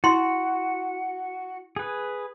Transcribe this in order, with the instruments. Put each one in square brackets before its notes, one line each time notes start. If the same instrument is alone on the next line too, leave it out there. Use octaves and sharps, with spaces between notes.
[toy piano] E4 C6 [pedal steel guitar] F#4
[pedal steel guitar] G#4 B4